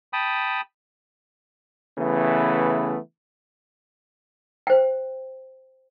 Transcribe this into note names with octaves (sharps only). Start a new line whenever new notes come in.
G5 A5 B5 D#6
C#3 E3 A3 B3
C5 G5